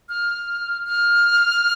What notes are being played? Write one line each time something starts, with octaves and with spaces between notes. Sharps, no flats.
F6
F6